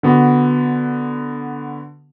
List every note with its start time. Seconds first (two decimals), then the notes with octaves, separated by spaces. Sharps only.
0.03 D3 B3 F#4